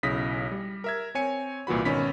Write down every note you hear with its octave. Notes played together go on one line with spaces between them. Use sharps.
B1 C#3 E4 D#6 A#6 B6
G3
A#4 E5 G#6
C4 C#5 G#5 C#7
C2 A#2 E3 F#4 B5
G#1 B2 D#3 C#4 B5 B6